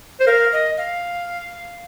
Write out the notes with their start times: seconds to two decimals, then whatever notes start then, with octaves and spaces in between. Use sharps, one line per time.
0.20 C5
0.27 A#4 F5
0.52 D#5
0.77 F5